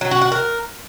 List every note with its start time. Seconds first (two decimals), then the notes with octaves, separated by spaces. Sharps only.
0.01 F#3
0.11 F#4
0.21 F#4
0.32 A#4